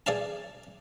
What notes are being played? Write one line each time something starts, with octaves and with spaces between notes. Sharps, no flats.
G#4 D5 F5 A5